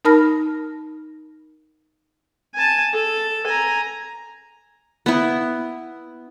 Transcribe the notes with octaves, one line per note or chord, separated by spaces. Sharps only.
D#4 A#4 A5 B5 F6 A#6
G#5 A5
A4
G#5 A#5
B3 E4